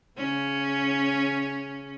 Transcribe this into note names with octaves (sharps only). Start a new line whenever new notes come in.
C#3 C#4